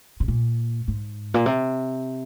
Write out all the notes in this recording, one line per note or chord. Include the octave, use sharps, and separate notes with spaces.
C3
A#2
G#2
A#2
C3